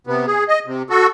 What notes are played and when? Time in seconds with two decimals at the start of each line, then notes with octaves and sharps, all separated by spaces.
0.07 C3 B3
0.27 G#4
0.48 D#5
0.66 C3
0.90 F#4 A4